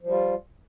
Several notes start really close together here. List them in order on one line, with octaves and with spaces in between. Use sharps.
F3 G3 F4